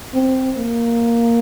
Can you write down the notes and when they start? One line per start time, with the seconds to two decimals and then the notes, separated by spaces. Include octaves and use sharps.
0.14 C4
0.57 A#3